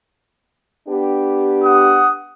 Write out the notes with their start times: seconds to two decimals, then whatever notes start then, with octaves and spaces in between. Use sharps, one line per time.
0.88 B3 D4 G4
1.64 F#5 D#6